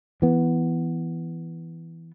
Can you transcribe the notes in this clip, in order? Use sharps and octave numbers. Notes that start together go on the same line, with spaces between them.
E3 B3